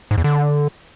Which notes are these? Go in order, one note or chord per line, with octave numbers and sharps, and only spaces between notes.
G#2
E2
D3